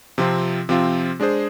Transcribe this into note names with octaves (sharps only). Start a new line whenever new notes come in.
C3 F3 C4 F4
C3 F3 C4 F4
G#3 D4 G#4 C5